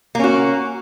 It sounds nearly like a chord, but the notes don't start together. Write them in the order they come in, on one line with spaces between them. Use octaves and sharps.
A#3 C#4 F#4